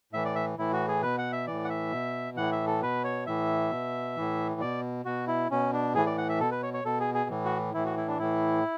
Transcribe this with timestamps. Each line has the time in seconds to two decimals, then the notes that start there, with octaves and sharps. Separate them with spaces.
0.13 A2 E3 E5
0.25 D5
0.35 E5
0.58 A2 E3 E4
0.73 F#4
0.88 G#4
1.02 B2 B4
1.18 F#5
1.32 E5
1.47 A2 E3 D5
1.64 F#5
1.70 E5
1.92 B2
2.37 A2 E3 F#5
2.52 E5
2.67 A4
2.81 B2 B4
3.04 C#5
3.27 A2 E3 E5
3.71 B2
4.17 A2 E3
4.61 B2 D5
5.05 B2 F#4
5.28 E4
5.51 B2 C#4
5.73 D4
5.95 A2 E3 G#4
6.06 D5
6.18 F#5
6.29 E5
6.40 B2 A4
6.51 B4
6.63 C#5
6.74 C#5
6.85 B2 A4
7.00 G#4
7.14 G#4
7.30 A2 E3
7.45 F#4
7.74 A2 E3 E4
7.85 F#4
7.97 E4
8.08 D4
8.19 A2 E3 E4